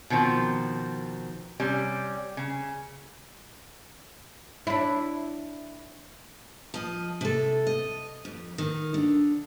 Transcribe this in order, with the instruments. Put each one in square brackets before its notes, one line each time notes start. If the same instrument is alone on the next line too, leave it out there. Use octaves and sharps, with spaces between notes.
[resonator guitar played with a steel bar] B2 D#3 F3 C4
C3 G3 C#4
C#3
[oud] D4 E4
[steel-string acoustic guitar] F3 D#5
C3 A4
D#5
F2
D#3
D3